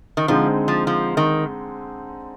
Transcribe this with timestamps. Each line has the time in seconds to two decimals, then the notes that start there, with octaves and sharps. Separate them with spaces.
0.17 D#3
0.28 D3 F3 G#3 C4 D#4
0.68 F3
0.87 F3
1.17 D#3